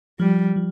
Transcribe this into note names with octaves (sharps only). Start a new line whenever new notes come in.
F3 G3
F3